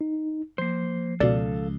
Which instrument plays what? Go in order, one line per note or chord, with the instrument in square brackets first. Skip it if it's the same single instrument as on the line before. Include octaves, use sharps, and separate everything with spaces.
[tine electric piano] D#4
[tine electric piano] F3 C7 [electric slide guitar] A#3 C5
[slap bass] C#2 [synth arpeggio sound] B2 D5 [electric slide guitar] A4 F5